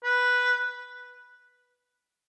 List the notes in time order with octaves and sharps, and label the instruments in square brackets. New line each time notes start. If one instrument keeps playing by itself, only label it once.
[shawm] B4